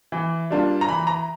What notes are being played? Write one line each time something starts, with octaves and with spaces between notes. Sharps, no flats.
E3
G3 A#3 D4 F4
A#5
E3 B5
A#5